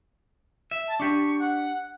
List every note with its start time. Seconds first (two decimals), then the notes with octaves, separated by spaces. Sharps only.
0.71 E5
0.88 A5
1.00 D4 G4 C#6
1.39 F#5